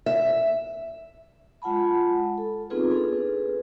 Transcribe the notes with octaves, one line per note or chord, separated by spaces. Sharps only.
E5
G#3 F4 F#5 A5 B5
A4
B3 C4 D#4 F4 G#4 B4
D4 G#4 A4 B4